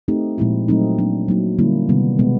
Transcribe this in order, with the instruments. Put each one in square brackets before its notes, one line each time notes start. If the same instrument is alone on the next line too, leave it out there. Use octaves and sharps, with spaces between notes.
[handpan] A3 C4 D#4 G4
A#2 F3 G#3 C4 E4
F#3 A3 C4 D#4
F#3 A#3 D4
F#3 A#3 D#4
D3 G3 A#3 C#4 E4
C3 D#3 G3 B3
B2 G#3 B3